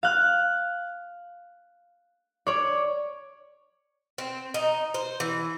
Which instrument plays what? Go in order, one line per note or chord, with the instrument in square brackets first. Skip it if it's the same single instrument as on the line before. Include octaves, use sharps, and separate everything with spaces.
[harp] F5 F#6
C#5 D5
[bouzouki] C4
D#4
C5
E3